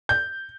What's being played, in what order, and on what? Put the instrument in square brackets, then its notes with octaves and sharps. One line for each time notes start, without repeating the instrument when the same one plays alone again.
[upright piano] G6